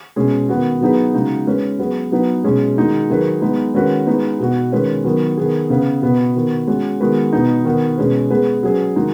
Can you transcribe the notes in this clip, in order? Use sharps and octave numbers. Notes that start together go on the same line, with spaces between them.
B2 G#3 C#4 G#4
D#3 B3 F#4
F#3 B3 D#4 G#4 B4
C#3 G#3 D#4 F#4
G#3 C#4 B4
F#3 B3 G#4 B4
F#3 B3 D#4 B4
B2 G#3 C#4 G#4
D#3 G#3 D#4 F#4
D#3 F#3 D#4 G#4 B4
G#3 B3 D#4 B4
D#3 G#3 C#4 F#4 B4
G#3 B3 D#4 B4
B2 B3 F#4
D#3 G#3 C#4 B4
D#3 F#3 B3
D#3 B3 G#4
C#3 B3 G#4 B4
B2 B3 F#4 B4
D#3 B3 F#4
G#3 C#4 F#4
D#3 G#3 B3 F#4 B4
B2 B3 D#4
D#3 B3 F#4
B2 G#3 C#4 G#4 B4
G#3 B3 G#4 B4
F#3 C#4 G#4 B4
D#3 G#3 D#4 F#4